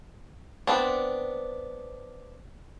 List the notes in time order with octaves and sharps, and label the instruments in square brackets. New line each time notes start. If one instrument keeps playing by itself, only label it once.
[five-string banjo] B3 C4 D4